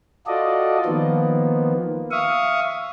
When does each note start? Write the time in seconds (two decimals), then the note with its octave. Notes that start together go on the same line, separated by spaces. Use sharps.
0.27 F4 F#4 A4 D5 D#5
0.85 D#3 F3 A#3 B3
2.11 E5 F5 C#6 D#6